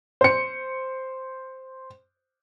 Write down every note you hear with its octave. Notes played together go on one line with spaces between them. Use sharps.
C5 C#7